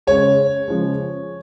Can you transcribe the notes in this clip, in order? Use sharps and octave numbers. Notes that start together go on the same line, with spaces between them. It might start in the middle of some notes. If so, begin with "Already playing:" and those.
C#3 G#3 C#5
C#3 F3 G#3